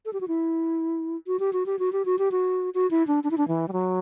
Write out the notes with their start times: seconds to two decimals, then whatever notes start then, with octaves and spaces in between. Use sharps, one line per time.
0.05 A4
0.13 G4
0.21 F#4
0.28 E4
1.27 F#4
1.39 G4
1.53 F#4
1.66 G4
1.79 F#4
1.92 G4
2.05 F#4
2.19 G4
2.32 F#4
2.74 F#4
2.91 E4
3.07 D4
3.24 D4
3.31 E4
3.38 D4
3.48 E3
3.68 G3
3.73 F#3